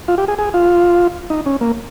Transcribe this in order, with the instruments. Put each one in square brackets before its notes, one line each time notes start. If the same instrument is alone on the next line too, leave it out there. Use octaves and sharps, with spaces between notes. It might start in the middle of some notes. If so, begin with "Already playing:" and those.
[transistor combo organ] F4
G4
G#4
G#4
F4
D#4
C#4
A#3